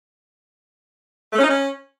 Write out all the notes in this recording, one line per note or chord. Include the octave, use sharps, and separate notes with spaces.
A3
C#4
D#4
C#4